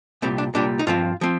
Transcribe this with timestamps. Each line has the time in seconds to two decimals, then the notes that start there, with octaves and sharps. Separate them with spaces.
0.22 C2 A#2 G3 C4
0.38 D4
0.55 C2 A#2 G3 D4
0.79 D#4
0.87 G2 F3 C4 F4
1.21 F3 C4